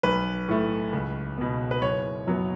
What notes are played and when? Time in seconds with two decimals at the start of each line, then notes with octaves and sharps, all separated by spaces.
0.03 B1 B4
0.48 A2 A3
0.93 C#2
1.38 B2 B3
1.71 B4
1.82 F#1 C#5
2.27 F#2 F#3 B3